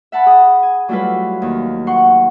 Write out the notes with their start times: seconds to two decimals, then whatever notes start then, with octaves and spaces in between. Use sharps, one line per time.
0.12 E5 F#5 A5 B5
0.26 G#4 D#6
0.63 G#5
0.89 F#3 G3 A3 E4 F4 B4
1.42 D#2
1.87 F#5 C6 C#6